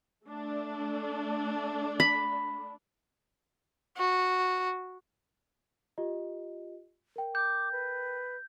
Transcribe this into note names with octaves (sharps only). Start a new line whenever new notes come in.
A3 D4
B5
F#4
F4 G4 D#5
A#4 G5
D6 G6
B4